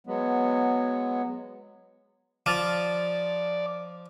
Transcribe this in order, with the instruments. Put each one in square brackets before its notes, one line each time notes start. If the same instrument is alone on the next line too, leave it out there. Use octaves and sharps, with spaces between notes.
[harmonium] F#3 G#3 B3
[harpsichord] F3 [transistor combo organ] D5 [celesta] D6 F6 A6